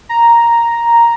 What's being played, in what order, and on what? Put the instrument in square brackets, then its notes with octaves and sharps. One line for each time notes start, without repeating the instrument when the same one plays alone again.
[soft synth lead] A#5